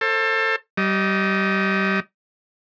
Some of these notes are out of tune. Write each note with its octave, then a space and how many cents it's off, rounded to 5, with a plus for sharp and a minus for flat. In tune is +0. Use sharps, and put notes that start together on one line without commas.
A4 +25 C5 +35
G3 -25 D#5 +10